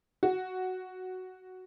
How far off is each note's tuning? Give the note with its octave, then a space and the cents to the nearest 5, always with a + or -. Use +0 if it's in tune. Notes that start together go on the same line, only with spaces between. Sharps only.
F#4 +5